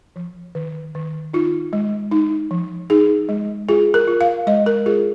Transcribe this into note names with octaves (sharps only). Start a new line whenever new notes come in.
F3
D#3
D#3
D#4 F4
G#3
D#4
F3
D#4 G#4
G#3
F4 G#4
A#4
F4
F5
G#3 D#5
A#4
F4 G#4